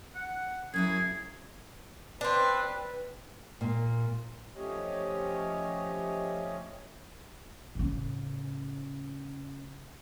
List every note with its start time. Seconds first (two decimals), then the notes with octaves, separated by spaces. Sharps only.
0.15 F#5
0.74 F#2 F#3 E4 G#4 G#6
2.21 C4 D4 B4
3.61 A#2
4.56 F3 A3 C#4 G4 C#5 D#5
7.75 A2 C#3